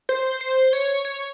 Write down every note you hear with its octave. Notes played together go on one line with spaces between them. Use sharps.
C5
C5
C#5
C#5